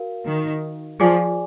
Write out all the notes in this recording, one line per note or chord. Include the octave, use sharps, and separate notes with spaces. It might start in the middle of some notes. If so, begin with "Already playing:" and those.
Already playing: F#4 A#4 F5
D#3
F3 G#4 D5 G#5 D6